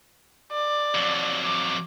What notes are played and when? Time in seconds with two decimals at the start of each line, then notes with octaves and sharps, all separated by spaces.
0.52 D5
0.95 F2 F#3
1.45 D6